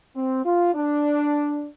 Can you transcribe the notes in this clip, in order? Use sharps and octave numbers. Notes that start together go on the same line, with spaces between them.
C4
F4
D4